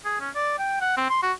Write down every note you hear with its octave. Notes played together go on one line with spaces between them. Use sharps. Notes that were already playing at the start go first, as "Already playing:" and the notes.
G#4
C#4
D5
G5
F#5
C4
C6
F#4